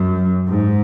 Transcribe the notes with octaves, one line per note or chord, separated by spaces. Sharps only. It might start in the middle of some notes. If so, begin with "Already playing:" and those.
Already playing: F#2
G#2